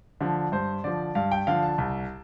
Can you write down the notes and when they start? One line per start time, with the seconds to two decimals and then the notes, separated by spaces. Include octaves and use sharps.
0.21 D3 F3
0.52 G2 C5
0.84 D3 F3 D5
1.15 G2 F5
1.31 G5
1.47 D3 F3 F5
1.62 A5
1.78 C2